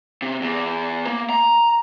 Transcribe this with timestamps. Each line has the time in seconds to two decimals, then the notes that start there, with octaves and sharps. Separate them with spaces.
0.22 C3
0.41 E2
1.07 A#3
1.30 A#5